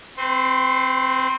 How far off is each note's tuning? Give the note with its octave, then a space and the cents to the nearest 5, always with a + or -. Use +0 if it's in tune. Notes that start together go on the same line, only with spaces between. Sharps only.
C4 +0 C5 -45 C6 +25